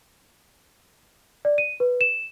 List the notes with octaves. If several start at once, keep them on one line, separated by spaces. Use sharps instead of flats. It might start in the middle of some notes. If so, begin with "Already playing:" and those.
D5
D#7
B4
E7